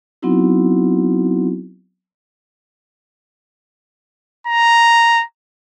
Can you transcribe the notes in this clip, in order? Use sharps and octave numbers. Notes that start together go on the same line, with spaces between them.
F#3 B3 C4 D#4 E4 F#4
A#5